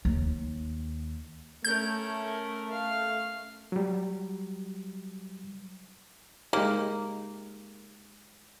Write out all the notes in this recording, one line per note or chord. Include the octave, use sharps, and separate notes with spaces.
D#2
A3 C#4 A#4 G6
F5
F#3 G3
G#3 A#3 D#4 G4